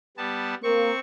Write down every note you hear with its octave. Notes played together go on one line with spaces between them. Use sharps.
G3 B3 A5
A#3 C4 C#6